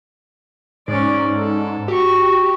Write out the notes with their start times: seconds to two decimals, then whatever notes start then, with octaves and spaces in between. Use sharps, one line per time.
0.88 G#2 C#4 D5
1.36 A4
1.88 F#4 G4 C#6